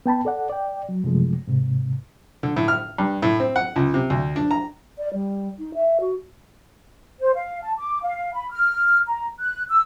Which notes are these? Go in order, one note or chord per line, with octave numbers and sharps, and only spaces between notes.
B3 G5 A5 B5
A4 D5 F#5
D5 G5
F#3
F#2 C3 F3 G#3 A3
G#2 C3
D3
A2
F6
G2
A2
C4
F#5
C#2
C3
D2
D4
A#5
D5
G3
D#4
E5
F#4
C5
F5
A5
D6
F5
B5
F6
A#5
F#6
E6